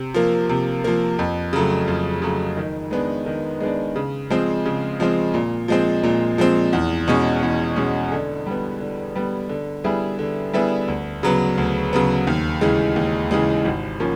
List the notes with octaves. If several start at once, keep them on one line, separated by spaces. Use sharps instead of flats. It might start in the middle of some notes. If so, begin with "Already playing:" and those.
Already playing: C3
F3 A#3
C3
F3 A#3
F2
C#3 F#3 A3
F2
C#3 F#3 A3
D#3
G#3 B3 D4
D#3
G#3 B3 D4
C#3
F3 G#3 C4
C#3
F3 G#3 C4
A#2
F3 G#3 C4
A#2
F3 G#3 C4
E2
B2 G#3 C#4
E2
B2 G#3 C#4
D3
G3 B3
D3
G3 B3
D3
G3 B3 E4 G#4
D3
G3 B3 E4 G#4
D2
C#3 F#3 B3
D2
C#3 F#3 B3
D#2
C#3 E3 G#3
D#2
C#3 E3 G#3
G#1
F3 A#3 C#4